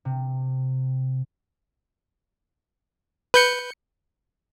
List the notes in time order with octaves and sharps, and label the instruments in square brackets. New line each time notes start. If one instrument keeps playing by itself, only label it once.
[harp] C3
[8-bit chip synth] B4 G6 C#7